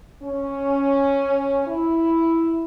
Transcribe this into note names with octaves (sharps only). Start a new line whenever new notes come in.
C#4
E4